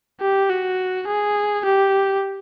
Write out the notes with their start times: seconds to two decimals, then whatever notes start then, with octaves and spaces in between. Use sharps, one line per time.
0.21 G4
0.50 F#4
1.08 G#4
1.65 G4